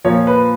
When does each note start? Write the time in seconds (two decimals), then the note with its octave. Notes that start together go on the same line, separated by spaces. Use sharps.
0.04 A#2 F3 C#5
0.27 B4